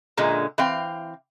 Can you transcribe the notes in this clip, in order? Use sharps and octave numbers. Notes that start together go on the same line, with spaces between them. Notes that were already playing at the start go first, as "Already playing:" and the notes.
F#2 A#2 D3 G#3
E3 C4 F5 G5